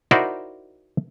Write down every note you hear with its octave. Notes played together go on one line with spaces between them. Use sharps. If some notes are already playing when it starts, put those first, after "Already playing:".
D#4 E4 F#4 A#4 C5 D5